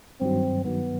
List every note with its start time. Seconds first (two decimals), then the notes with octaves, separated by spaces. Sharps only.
0.21 G2 D#3 F#3 C4
0.65 G2 D#3 F#3 B3